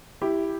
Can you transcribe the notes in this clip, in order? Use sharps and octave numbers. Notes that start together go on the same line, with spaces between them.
E4 G4